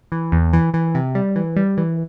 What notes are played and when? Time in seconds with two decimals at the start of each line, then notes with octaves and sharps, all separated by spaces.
0.12 E3
0.32 E2
0.53 E3
0.74 E3
0.95 C3
1.15 G3
1.36 E3
1.56 G3
1.77 E3